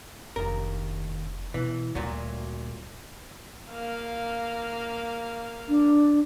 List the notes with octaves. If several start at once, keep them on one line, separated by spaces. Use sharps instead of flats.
F1 D#2 D4 A#4
B2 E3
D2 A#2 F#3 G3
A#3 F5
D4